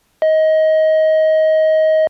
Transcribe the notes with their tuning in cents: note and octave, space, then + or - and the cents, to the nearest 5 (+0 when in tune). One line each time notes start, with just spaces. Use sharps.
D#5 +20